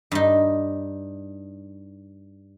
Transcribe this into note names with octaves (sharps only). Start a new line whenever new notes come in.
G2 D#4